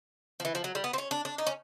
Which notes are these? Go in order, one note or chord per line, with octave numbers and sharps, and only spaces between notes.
F3
E3
F3
F#3
G3
B3
C4
C#4
D4
D4
D#4
C#4